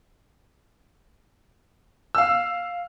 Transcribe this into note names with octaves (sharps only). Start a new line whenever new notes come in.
F5 E6